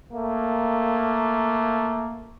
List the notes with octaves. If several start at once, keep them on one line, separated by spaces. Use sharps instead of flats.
A3 A#3